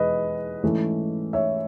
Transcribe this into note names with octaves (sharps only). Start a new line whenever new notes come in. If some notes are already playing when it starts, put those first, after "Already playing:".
Already playing: E2 B2 G#3 B4 D#5
G#2 E3 A3 C#4
C#5 E5